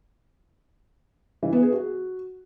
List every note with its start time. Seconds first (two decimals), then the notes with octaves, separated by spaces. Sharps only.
1.43 E3
1.53 B3
1.62 G#4
1.72 F#4